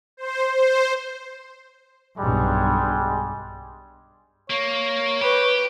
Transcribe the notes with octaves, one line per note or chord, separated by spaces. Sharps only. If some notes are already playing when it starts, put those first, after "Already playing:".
C5
C5
B1 G2 G3 G#3
A#3 C#5
G4 B4